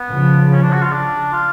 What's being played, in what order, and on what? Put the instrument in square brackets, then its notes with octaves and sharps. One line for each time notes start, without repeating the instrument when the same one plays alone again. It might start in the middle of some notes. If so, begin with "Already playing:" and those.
Already playing: [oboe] B3
[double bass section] C#3 F3
[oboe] C#4
D4
F#4
F4
D4
F4